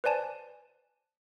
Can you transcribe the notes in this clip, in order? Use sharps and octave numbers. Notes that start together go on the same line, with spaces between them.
B4 C5 D5 G#5 A5